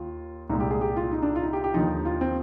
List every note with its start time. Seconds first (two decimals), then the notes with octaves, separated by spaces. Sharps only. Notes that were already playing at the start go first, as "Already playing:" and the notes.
Already playing: D#2 F4
0.49 C2 A#2 G#3 D#4
0.60 G4
0.71 G#4
0.81 G4
0.97 F4
1.12 D#4
1.22 D4
1.36 F4
1.43 D#4
1.53 G4
1.64 G4
1.74 D#2 D3 F3 D#4
2.05 F4
2.21 C4